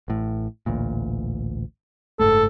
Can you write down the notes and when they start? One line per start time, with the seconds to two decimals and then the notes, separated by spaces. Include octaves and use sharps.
0.08 A1 A2
0.66 A1 D2 A#2
2.19 F#1 G#2 A3 A4